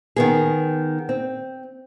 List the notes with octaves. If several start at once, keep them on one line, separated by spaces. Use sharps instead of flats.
D#3 B3 G#4
C4